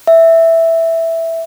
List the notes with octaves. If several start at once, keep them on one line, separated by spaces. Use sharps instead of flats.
E5